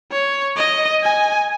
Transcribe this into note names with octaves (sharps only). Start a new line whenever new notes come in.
C#5
D#5
G#5